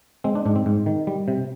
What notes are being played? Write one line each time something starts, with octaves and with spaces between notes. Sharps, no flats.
G#3 C4
D4
G#2 D4
C4
G#2
D#3
G3
C3